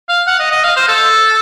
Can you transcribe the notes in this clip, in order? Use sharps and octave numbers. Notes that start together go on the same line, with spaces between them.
F5
F#5
D#5
D#5
F5
C5
A4